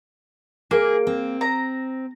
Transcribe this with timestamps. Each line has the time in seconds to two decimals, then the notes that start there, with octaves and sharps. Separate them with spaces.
0.71 A#3 G#4
1.07 C4
1.41 A#5